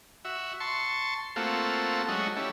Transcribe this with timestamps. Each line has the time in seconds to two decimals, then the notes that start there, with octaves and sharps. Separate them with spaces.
0.25 F#4 E5
0.60 A5 C6 C#6
1.36 A3 A#3 C4 F4 F#4 A4
2.08 F#3 G#3 A3 C#4 D#4 F#4
2.36 G3 C#4 E4 A4